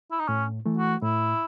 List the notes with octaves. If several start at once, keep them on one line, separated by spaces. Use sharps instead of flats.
E4
D#4
A2 C#4
E3 A3
F#4
A2 E4